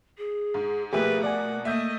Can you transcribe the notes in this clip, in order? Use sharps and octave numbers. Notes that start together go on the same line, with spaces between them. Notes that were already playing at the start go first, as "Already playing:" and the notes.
G#4
G#2
B2 F3 A3 A#3 G4 G#4 B4 E5
D5 F#5 G#5
A3 A#3 D#5 E5 G6